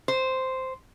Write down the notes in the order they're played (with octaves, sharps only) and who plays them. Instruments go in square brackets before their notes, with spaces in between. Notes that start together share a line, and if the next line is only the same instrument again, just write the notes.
[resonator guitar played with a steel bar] C5